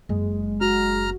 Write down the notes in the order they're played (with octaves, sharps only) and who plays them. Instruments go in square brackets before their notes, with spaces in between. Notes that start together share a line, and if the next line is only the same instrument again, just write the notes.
[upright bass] F#1 [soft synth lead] G#3
[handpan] F#4 [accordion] A#5 F6